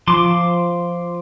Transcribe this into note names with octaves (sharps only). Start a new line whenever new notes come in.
F3 C6 D6